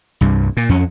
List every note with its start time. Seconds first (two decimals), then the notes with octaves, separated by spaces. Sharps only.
0.21 C2 G2
0.57 A#2
0.69 F2 C#4